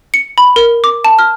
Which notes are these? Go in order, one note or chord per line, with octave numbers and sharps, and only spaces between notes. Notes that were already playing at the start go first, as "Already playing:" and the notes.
C#7
B5
A#4
D6
A5
F6